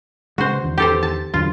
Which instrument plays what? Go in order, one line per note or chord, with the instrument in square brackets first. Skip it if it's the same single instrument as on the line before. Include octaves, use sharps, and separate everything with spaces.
[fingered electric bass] C#3 G#3 [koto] F#4 C5
[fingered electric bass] E2 D#3
[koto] G4 A4 C5
A5
[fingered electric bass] E2 D3 F#3 [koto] F4